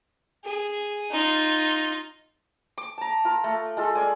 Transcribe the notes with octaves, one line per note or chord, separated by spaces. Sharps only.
G#4
D#4 F4
D6
A5 A#5
F4 A#4
A3
G#3 F4 A4
D5 G#5 C6